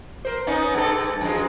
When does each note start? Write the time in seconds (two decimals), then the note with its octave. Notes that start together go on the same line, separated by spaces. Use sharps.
0.25 A#4 C5
0.47 B3 C#4 D#4
0.75 G2 A4
1.21 F#2 F3 G#3